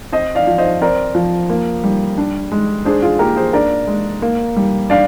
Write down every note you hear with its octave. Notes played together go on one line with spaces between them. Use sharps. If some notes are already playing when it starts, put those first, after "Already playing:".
C4 C5 D#5
D5 F5
F3
C5 D#5
C4 A#4 D5
F3
A#3
G3
D4
G#3
D4 G#4 C5
F4 G#4
A#3 G4 A#4
G#4 C5
D4 A#4 D5
G#3
A#3
G3
D4 D5 F5